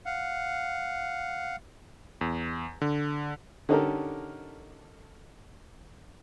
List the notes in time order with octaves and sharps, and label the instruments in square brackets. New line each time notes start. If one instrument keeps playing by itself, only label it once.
[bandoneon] F5 F#5
[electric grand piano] E2
D3
[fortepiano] D3 C#4 D#4 G4 A4 A#4